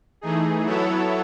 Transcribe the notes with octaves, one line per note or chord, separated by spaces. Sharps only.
E3 A3 D#4 G#4
F#3 B3 E4 A4 C#5